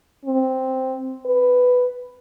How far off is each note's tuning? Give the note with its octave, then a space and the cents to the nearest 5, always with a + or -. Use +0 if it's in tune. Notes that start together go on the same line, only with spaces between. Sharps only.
C4 +0
B4 +5